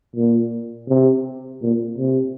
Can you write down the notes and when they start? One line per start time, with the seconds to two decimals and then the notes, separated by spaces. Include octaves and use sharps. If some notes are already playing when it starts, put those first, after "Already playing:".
0.16 A#2
0.89 C3
1.61 A#2
1.98 C3